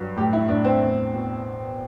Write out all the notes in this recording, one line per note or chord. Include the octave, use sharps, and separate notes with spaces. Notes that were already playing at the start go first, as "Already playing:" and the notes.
Already playing: G2 F#3
A2 G4
E4
A2 D4
C4
E2
B2